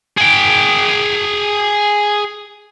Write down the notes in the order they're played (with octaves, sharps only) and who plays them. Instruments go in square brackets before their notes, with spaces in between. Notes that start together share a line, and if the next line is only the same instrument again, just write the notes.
[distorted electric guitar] G#4 G5